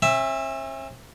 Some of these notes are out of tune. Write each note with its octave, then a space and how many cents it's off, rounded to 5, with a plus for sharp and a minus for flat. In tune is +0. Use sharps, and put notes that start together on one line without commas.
C#4 -45 E5 +0 A5 +0